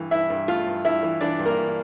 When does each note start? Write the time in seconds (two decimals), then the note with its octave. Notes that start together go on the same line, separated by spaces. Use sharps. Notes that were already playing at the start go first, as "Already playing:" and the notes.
Already playing: G2 E3
0.11 G2 E4 E5
0.30 G2
0.48 A3 F4 F5
0.67 G2
0.85 G2 E4 E5
1.03 E3
1.21 E3 D4 D5
1.39 G2
1.45 A#3 A#4
1.57 E3